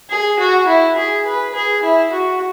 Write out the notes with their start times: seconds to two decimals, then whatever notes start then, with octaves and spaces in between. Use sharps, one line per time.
0.10 G#4
0.39 F#4
0.67 E4
0.97 G#4
1.26 B4
1.54 G#4
1.83 E4
2.11 F#4